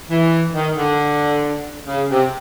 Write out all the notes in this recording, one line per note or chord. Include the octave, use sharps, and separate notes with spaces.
E3
D#3
D3
C#3
C3